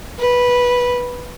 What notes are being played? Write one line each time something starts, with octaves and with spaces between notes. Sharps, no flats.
B4